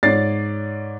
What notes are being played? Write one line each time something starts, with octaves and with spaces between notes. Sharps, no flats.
G#2 C#5 D5 A6 C7